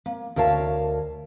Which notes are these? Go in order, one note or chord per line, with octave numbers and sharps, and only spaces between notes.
A#3
D2 A#4 C#5 F5 A5